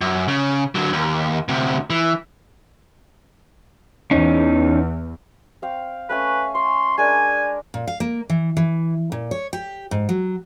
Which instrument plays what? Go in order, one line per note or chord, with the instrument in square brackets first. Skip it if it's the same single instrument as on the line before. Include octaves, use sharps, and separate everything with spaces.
[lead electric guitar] F#2
C#3
D3 F#3
D#2
D2 C3
E3
[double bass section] E2 [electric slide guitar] C#4 D#4
[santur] C4 F5 G5
[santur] A3 C#4 G#5 [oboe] B4
[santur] C#5 [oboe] C6
[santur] G#3 D4 A#4 [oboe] G#5
[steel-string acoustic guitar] A#2
F5
A#3
E3
E3
A#2
C#5
G4
G#2
F#3